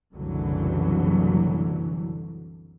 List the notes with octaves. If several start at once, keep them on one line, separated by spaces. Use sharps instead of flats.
F#1 C2 F#2 D3 E3 F#3